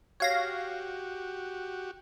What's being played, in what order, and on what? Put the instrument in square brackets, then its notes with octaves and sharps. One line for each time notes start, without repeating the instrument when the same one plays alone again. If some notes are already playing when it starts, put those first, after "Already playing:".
[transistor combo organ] F#4 G4 [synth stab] C#5 F5 A#6